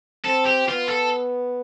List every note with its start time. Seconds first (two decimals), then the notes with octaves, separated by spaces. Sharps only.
0.24 C4 A4
0.45 G4
0.67 B3 F4
0.89 A4